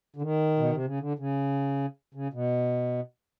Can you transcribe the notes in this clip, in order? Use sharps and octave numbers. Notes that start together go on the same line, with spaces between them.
D3
D#3
B2
C3
C#3
D3
C#3
C#3
B2